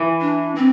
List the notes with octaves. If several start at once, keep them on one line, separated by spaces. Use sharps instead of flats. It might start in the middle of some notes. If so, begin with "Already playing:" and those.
Already playing: E3
D4
C4